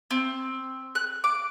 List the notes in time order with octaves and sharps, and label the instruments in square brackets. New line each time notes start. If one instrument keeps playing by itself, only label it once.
[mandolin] C4
F#6
D6